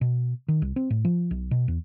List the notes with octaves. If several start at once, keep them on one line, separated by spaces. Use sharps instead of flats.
B2
D#3
C2
C4
A2
F3
B1
B2
E2